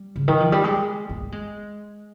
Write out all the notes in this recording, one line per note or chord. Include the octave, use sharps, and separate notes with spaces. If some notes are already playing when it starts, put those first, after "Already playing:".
Already playing: G3
C#3
D#3
F3
G3
G#3
A#3
G#3